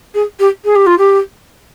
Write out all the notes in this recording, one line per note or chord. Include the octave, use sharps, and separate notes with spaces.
G#4
G4
G#4
G4
F4
G4